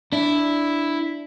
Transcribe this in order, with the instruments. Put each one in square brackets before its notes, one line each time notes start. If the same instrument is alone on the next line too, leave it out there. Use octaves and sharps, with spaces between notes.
[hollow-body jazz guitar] D4 [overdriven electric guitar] E4